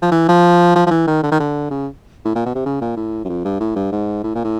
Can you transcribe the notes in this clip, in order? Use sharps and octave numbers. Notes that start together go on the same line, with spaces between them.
F3
E3
F3
F3
F3
E3
D#3
D3
D#3
D3
C#3
A2
A#2
B2
C3
C#3
A#2
A2
F#2
F2
G2
A2
G2
G#2
A2
A#2
A2